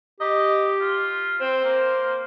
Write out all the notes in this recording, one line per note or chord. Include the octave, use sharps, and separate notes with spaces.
G4 D#5
F4
C4 C5
A#3